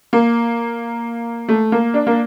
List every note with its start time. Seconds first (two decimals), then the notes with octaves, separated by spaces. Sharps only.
0.13 A#3
1.48 A3
1.72 A#3
1.94 D4
2.07 A#3